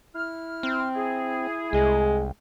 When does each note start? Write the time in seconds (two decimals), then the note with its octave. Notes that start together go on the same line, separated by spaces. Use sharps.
0.15 E4 F6
0.63 C4
0.96 E4 G#4
1.73 C2 G#3